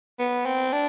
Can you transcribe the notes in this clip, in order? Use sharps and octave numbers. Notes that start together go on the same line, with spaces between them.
B3
C4
D4